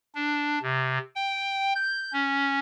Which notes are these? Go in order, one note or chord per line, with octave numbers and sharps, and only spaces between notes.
D4
C3
G5
G6
C#4